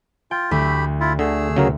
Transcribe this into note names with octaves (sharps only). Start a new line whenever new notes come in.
F4 G5
D2 A3 G4 B5
E4 F4
D3 A3 G#4 E6
C#3 F#3 A#4